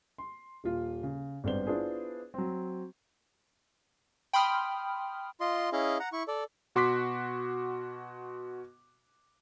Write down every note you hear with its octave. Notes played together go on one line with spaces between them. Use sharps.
C6
D#1 F4
C#3
G#1 G2 G3 B3 C5 G7
B3 D4 E4 F4 G#4 C5
F#3 C4
G5 B5 C6 D#6 F6
F4 D#5 C6
C#4 E4 G#4 D#5 F5
F#5 A#5
E4 C#6
A4 D5
B2 F#4 C6 D6 F#6 B6